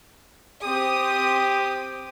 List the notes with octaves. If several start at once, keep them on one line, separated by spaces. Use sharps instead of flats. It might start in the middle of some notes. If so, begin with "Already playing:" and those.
C4 G4 D#6